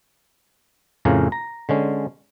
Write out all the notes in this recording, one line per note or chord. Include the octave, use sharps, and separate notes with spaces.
F2 A2 C#3 C#4 A#4 F5
A#5
D3 G#3 C#4